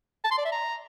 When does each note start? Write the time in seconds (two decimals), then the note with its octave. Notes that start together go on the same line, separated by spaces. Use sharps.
0.24 A5
0.31 C6
0.38 D5
0.45 E5
0.52 A#5